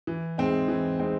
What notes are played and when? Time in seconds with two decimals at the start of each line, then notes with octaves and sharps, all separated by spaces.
0.07 E3
0.38 G#3 C4 D#4
0.68 E3
0.99 G#3 C4 D#4